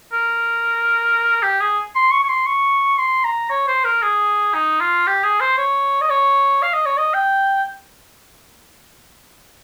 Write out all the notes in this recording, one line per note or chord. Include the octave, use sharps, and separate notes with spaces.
A#4
G4
G#4
C6
C#6
C#6
C6
C#6
C6
A#5
C#5
C5
A#4
G#4
D#4
F4
G4
G#4
C5
C#5
D#5
C#5
F5
D#5
C#5
D#5
G5